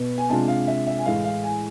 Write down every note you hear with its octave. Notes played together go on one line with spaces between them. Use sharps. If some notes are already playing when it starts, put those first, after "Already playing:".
Already playing: B2 B3
G#5
C3 G#3 D4 F4 A5
F5
E5
E5
G#5
A2 E3 G#3 F5
F5
G#5